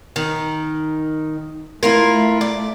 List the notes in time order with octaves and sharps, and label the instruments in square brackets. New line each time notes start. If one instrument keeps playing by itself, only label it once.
[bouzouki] D#3
[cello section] A3 [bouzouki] E4 F4 A#4
[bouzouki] D5